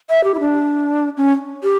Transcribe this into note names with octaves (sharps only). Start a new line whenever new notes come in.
E5
G4
E4
D4
C#4
G4